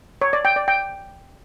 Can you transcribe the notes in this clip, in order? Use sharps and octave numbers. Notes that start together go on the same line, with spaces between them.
C#5
D5
G5
D5
G5